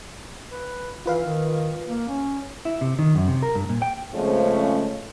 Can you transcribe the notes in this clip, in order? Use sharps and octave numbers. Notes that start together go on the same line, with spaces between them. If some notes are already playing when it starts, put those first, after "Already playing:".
B4
E3 F4 B4 F5
D#3
A#3
C#4
E4
C3
D#3
F#2
C3
A#4
G2
A#2
G5
C#3 F3 G#3 A3 C4 C#4